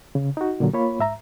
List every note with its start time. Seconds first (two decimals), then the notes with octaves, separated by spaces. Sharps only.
0.15 C#3
0.37 D#4 F#4
0.60 A#2 D3 F#3
0.73 A#3 F4 C#5 B5
1.00 G#2 E5 A#5